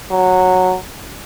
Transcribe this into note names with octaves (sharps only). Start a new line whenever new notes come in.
F#3